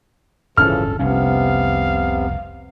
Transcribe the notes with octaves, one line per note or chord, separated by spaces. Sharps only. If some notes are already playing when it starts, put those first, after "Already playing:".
D1 G1 C#3 E3 F3 C#4 A4 F6
F1 C2 C3 B3 C#4 F5